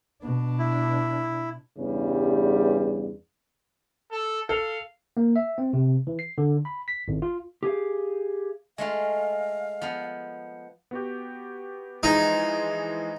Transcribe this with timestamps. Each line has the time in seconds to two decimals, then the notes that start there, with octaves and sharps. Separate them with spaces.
0.23 B2 D4
0.59 E4
1.78 E2 G2 C#3 G3
4.11 A4
4.49 A4 F5
5.17 A#3
5.36 E5
5.58 C4
5.73 C3
6.07 E3
6.19 C7
6.38 D3
6.65 B5
6.88 B6
7.08 G#1
7.22 F4
7.63 G4 G#4 F5
8.78 G#3 A3 F4 F5
9.81 F3 B3
10.91 B3 F#4 G4
12.03 E3 F3 G#3 D#4